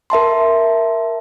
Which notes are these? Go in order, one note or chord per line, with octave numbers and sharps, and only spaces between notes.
A#4 E5 A5 C6